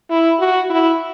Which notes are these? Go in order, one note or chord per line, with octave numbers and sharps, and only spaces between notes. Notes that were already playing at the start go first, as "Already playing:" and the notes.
E4
F#4
E4